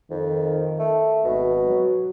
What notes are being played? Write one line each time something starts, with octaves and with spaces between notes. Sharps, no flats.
F2 D#3
A3
G#1 B2
F#3